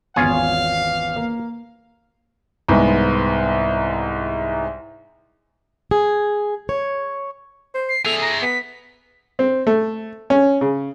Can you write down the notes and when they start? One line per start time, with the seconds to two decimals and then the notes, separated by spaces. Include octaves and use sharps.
0.16 G#1 E2 C#4 F4 G#4 F5
1.16 A#3
2.69 C2 G#2 G#3 B3
5.91 G#4
6.69 C#5
7.74 C5
7.89 C7
8.05 G#4 A4 E5 F7
8.21 A#5
8.42 B3 B6
9.39 C4
9.67 A3
10.30 C#4
10.61 C#3